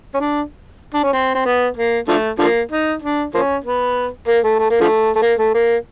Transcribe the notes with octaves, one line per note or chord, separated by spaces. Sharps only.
C#4
D4
D4
C#4
C4
C4
B3
A#3
D3 F3 A3
D3 F3 A#3
D#4
D4
F3 A#3 C#4
B3
A#3
A3
A3
A#3
D3 F3 A3
A3
A#3
A3
A#3